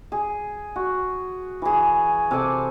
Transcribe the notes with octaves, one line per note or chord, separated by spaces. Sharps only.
G#4
F#4
E3 G#4
C3 A4 G#5 D6